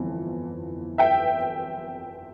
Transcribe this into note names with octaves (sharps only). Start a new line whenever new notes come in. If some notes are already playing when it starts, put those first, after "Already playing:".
Already playing: G1 F2 E3
E5 G5